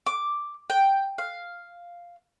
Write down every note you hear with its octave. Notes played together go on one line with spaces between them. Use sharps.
D6
G5
F5